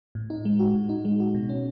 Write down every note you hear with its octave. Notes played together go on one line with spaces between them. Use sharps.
A2
D#4
G#3
F#4
A2
D#4
G#3
F#4
B2
C#4